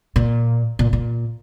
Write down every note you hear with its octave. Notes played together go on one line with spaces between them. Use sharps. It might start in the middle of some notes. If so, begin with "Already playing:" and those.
A#2
A#2
A#2